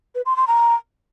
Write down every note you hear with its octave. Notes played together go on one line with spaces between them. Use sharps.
B4
C6
C6
A#5